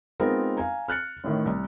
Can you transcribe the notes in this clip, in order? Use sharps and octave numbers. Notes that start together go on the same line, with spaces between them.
G#3 B3 C4 D#4 F4 A#4
F5 G#5 A#5
F6 F#6 A6 C#7
A1 A2 D#3
C2